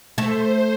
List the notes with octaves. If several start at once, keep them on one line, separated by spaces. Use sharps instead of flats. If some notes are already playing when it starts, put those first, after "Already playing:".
A3 C5